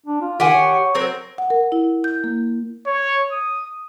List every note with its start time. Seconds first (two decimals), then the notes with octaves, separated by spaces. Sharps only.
0.06 D4
0.21 F4
0.40 D#3 G4 F#5 G#5
0.53 C#5
0.95 F#3 C4 A#4
1.38 F#5
1.50 A#4
1.72 E4
2.04 G6
2.24 A#3
2.87 C#5
3.32 D#6